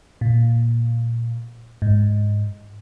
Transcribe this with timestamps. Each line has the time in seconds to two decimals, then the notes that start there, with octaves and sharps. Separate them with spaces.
0.21 A#2
1.82 G#2